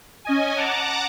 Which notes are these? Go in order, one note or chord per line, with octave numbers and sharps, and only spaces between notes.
C#4 D#5 G#5
F#5 A5 A#5 D6